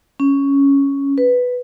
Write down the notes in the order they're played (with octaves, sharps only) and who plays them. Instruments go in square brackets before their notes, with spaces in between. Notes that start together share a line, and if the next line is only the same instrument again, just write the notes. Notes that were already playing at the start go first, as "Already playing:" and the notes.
[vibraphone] C#4
B4